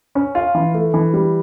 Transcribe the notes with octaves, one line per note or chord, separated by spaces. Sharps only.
C#4
F4
E3
A3
E3
G3